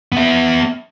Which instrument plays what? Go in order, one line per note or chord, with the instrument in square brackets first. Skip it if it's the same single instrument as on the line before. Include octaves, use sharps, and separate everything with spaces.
[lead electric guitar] B3 E5